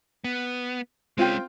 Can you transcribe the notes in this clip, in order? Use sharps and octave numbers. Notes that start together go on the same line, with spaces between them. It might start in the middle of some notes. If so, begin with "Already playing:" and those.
B3
G#3 C4 C#4 F4 G5